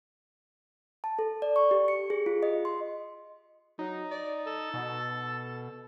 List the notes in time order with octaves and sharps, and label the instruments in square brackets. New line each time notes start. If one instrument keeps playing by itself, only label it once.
[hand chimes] A5
A4
D5
C#6
G4
C#7
G#4
F4
D#5
C6
[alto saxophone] F#3 [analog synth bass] D#4
[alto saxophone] D5
A4
[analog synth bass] B2